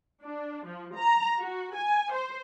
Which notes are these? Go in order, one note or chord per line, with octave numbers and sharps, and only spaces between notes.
D4
F3
A#5
F#4
G#5
C5